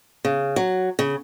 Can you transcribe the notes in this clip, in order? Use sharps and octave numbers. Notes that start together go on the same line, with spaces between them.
C#3
F#3
C#3